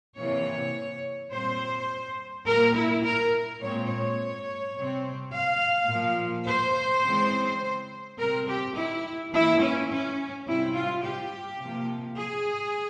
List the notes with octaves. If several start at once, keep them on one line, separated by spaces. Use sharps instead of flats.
C3 E3 A#3 C#5
A#2 G3 C4 C5
A#2 G3 A#3 A#4
E4
A#4
A#2 G#3 C4 C#5
C#5
C3 G3 C4
F5
A#2 F3 A#3
C5
C#3 E3 G#3 C4
C3 G3 C4 A#4
G4
E4
E3 A#3 E4
C#4
C#4
C3 G3 C4 E4
F4
G4
C3 F3 A#3
G#4